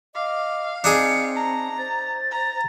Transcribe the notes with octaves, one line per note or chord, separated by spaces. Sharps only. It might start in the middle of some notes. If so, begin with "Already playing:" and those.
D#5 F5 D6
C4 D4 D#4 G#4 C#7
A5 A#5
C5 A6
A#5